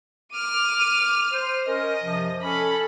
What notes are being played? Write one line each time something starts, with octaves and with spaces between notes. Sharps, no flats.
D6 F6 D#7
C5
C#4 A#4 D#5
F#2 C3 F3
C#4 A4 B5